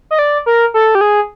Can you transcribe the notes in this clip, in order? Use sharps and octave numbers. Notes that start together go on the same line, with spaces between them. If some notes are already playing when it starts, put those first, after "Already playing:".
D#5
D5
A#4
A4
G4
G#4